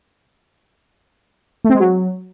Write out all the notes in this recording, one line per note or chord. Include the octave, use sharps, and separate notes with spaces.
A3
C4
G#3
F#3